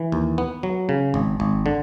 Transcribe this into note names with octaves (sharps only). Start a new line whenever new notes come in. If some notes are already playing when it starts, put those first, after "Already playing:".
Already playing: E3
D#2
B3
F#3
C#3
G#1
G#1
D3